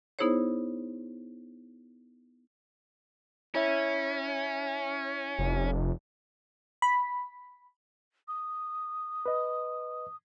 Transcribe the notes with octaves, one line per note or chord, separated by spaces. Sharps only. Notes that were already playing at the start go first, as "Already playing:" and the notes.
B3 D#4 E4 G#4 C5 C#5
C#4 E4 C#5 E5
F1
B5
D#6
B4 D#5